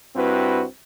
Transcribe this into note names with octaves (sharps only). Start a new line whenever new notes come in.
G2 C4 E4 F#4 B4